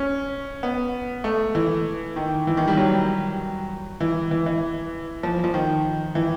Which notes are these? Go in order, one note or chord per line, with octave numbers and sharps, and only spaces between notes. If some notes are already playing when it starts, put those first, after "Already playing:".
Already playing: C#4
B3
A3
E3
D#3
E3
D#3
G3
F#3
E3
E3
E3
F3
F3
D#3
E3